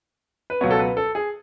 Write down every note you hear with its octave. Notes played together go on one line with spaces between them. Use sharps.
B4
C#2 B2 F#3 B3 C#5
A4
B4
A4
G#4